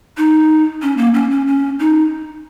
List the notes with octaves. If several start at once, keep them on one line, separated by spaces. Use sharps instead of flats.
D#4
C#4
A#3
C#4
C#4
C#4
D#4